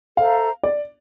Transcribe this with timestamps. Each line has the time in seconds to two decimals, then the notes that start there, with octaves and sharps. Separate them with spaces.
0.17 A4 C5 E5 F5 A#5
0.63 D5